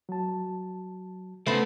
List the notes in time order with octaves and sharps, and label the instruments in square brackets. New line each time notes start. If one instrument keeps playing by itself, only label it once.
[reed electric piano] F#3 A5
[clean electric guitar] C#3 C5 B5 [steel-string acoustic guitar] A3 B3